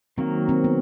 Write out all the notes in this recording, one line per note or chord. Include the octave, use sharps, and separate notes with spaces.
D#3 F#3 A#3 C4
C4
B3